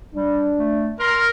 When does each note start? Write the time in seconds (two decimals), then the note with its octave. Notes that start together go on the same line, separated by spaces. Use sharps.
0.14 G3 D4
0.59 A3
1.00 A#4 C6